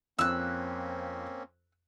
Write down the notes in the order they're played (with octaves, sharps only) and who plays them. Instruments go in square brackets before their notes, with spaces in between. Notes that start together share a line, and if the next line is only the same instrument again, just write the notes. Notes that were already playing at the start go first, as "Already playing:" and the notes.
[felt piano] F2 [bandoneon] A#3 C4 C#4 [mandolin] E6 F#6